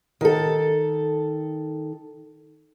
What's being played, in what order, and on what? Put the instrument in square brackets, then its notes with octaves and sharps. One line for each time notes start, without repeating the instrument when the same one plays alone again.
[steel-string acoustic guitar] D#3 A4